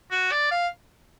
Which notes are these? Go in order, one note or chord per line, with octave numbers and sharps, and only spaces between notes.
F#4
D5
F5